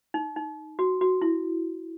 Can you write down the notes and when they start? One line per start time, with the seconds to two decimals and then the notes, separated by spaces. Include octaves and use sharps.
0.14 D#4
0.36 D#4
0.79 F#4
1.01 F#4
1.22 E4